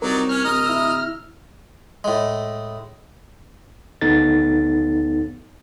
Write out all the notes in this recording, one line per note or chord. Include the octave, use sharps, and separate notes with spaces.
C2 F#3 D#4 A#4 D5
C#4 C#5 F6
D1 D#5 A#5
E4 E6
A2 G#3
D2 B3 D#4 A4 A6